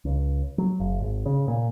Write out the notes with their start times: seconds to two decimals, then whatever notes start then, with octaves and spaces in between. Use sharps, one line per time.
0.05 C#2
0.58 F#3
0.80 F#1
1.01 G#1
1.26 C#3
1.48 A#2